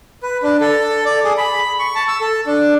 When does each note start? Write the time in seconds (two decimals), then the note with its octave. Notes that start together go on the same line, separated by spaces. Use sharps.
0.23 B4
0.43 D4
0.61 A4
1.05 D5
1.25 G#4
1.37 B5
1.79 C#6
1.95 A5
2.08 E6
2.21 A4
2.47 D4